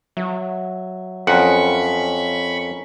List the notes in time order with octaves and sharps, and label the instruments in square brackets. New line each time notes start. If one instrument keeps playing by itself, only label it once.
[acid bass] F#3 [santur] E5
[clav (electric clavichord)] F2 F#5 [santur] C#4 A#4 [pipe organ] B5 C#6